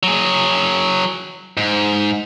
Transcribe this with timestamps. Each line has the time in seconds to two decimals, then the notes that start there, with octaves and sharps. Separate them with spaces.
0.03 F#3 G#4
1.57 G#2